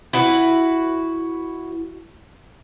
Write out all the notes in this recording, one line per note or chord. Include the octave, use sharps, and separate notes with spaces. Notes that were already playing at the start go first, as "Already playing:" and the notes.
E4 F#4 B4